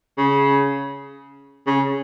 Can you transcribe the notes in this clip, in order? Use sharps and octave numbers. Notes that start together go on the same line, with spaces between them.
C#3
C#3